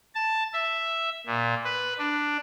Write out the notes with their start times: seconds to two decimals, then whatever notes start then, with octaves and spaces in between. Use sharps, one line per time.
0.15 A5
0.53 E5
1.26 A#2
1.64 B4
1.99 D4